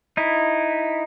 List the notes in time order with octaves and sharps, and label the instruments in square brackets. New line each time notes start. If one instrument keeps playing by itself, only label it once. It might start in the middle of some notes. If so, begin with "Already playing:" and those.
[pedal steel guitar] D#4 E4